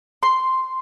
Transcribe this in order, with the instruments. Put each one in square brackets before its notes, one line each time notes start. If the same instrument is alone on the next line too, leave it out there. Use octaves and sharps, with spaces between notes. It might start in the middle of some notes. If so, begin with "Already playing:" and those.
[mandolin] C6